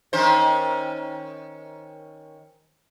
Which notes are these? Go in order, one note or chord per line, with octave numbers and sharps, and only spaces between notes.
D#3 C#4 C5